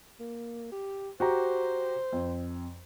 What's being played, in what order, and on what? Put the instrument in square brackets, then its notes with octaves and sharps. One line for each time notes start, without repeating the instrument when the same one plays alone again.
[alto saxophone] A#3
G4
[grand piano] F#4 G4 A#5 [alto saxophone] C5
[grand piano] F2